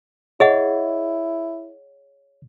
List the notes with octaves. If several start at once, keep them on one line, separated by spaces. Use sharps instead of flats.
E4 G#4 C#5 D#5 F#5